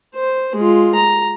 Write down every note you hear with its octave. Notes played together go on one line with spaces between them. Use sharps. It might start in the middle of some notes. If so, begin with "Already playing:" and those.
C5
G#3 F4
A#5